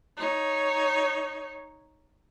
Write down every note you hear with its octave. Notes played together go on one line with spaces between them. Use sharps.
D#4 C#5